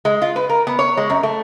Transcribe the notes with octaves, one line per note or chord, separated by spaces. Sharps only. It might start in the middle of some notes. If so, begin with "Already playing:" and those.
G#3
F4
B4
A#4
B3
C#5
G#3
F#2
A3